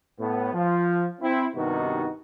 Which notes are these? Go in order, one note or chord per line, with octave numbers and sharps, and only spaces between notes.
A2 B3
F3
C4 E4
G2 C3 D#3 B3 D#4 F#4